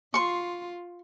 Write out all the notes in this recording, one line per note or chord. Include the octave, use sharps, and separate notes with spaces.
F4 C6 C#6